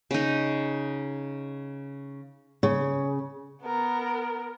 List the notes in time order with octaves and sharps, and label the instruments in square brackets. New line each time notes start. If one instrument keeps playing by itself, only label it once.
[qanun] C#3 D#4
[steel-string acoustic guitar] C#3
[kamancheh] B3 A#4